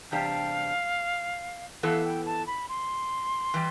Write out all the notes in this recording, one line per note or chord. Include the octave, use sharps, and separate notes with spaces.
E2 C3 G3 D4 G4 F5
E3 B3 E4 A4 F5
G5
A5
B5
C6
E3 G3